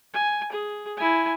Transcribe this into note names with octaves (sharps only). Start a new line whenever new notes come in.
G#5
G#4
E4 G#5